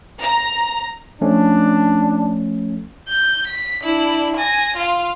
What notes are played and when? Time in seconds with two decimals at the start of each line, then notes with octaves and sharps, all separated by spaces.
0.21 A#5
1.21 F3 A3 C#4 D4
3.09 G6
3.47 B6
3.83 D4 E4
4.37 G#5 A#6
4.77 F4 F5